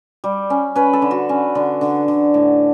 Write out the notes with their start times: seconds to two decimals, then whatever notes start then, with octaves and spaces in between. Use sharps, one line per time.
0.24 G3
0.50 C#4
0.75 C#4 B4
0.93 A4
1.02 D3
1.11 F#4
1.29 C#4
1.55 D3
1.81 D3
2.08 D3
2.34 A2